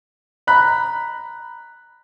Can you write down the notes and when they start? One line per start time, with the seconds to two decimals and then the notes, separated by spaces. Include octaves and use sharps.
0.47 A#5 B5 F#6